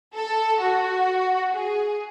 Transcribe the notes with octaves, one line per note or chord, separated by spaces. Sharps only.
A4
F#4
G#4